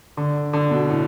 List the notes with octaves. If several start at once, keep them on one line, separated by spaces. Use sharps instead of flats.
D3
D3
B2
A2